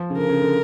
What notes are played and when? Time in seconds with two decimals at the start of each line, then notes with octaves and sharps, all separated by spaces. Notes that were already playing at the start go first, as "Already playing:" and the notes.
Already playing: F3
0.10 C#3
0.17 D3 A#4
0.30 C#3
0.41 D3